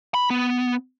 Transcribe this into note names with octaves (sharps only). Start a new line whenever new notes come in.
B5
B3